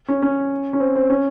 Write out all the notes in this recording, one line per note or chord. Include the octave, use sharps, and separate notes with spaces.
C#4
C#4
C#4
C4
C4
C#4